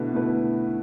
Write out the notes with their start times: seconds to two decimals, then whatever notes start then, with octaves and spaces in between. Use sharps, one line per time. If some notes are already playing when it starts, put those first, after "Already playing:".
Already playing: B2 D3 A3 E4 B4
0.13 B2 A3 E4 B4